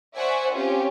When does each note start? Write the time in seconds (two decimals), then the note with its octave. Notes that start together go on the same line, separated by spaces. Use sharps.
0.16 C5 D5 E5 F#5 G#5 C#6
0.52 C4 C#4 F4 G4